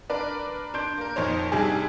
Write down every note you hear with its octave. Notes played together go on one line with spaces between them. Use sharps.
D4 A#4 B4 D5
D4 C6 G6 D7
A#3 A#4
F2 A#2 D#4 C5 C#5
G#2 C3 G3 D4 G#4